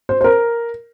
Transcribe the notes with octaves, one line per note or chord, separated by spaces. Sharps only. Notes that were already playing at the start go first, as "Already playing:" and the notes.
C5
C5
A#4